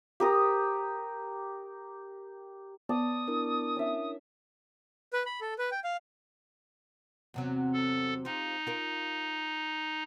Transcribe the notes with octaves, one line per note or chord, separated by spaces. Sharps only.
G4 A#4 D#6
B3 D5 A5 D#6
D4 E4 A#4
C#4 E5
B4
B5
A4
B4
G5
F5
E2 C3 F#3
A4
D#4 F4 G4 C5
F4 A#4